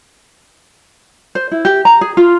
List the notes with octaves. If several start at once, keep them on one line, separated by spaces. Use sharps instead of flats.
C5
E4
G4
A#5
G#4
F4